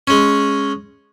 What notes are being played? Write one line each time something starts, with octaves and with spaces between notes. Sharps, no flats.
G#3 C#4